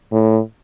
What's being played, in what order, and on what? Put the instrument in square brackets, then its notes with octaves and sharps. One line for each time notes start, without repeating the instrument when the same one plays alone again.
[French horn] A2